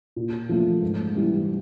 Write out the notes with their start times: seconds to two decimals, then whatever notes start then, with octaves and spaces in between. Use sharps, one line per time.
0.16 A#2
0.49 F3 A3
0.82 G#2
1.15 E3 G3